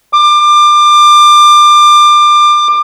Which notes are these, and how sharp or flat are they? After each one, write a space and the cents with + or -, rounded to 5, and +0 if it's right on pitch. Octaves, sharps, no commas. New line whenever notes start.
D6 +25